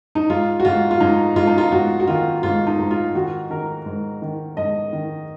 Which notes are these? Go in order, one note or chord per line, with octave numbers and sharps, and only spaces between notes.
D#4
G#2 F4
F#4
G#2 F4
F4
G#2 D#4
G#2 F4
D#4
F4
G#2 F#4
F#4
D#3 F4
G#2 F4
D#4
G#2
F4
D#3 F#4
D#3 A#4
G#2
D#3
G#2 D#5
D#3